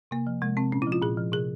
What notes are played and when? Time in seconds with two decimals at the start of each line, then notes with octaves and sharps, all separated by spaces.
0.11 C3 A#3
0.27 F3
0.42 C3 G#3
0.57 C3 C4
0.72 A#2 C#4
0.82 E4
0.87 F3
0.92 F4
1.02 A#2 G#4
1.17 F3
1.32 C3 G#4